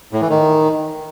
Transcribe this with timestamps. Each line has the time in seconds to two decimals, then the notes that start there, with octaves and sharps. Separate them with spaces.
0.13 A2
0.21 E3
0.30 D#3